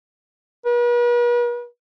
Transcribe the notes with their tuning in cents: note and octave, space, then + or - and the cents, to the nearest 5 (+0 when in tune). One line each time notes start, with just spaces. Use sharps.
B4 -45